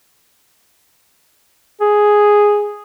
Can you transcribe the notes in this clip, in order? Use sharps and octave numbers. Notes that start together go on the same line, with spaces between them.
G#4